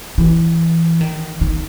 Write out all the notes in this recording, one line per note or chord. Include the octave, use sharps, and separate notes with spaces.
E3
D#3
D#3